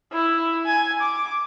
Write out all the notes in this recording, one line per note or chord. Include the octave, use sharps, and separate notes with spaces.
E4
G#5
D6